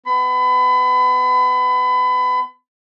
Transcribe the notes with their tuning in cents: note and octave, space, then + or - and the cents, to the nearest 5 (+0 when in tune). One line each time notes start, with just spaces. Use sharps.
B3 +25 B5 +30